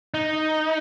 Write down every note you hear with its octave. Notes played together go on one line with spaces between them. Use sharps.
D#4